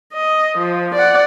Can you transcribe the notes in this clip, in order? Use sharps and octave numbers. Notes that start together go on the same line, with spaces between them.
D#5
F3
D5 F#5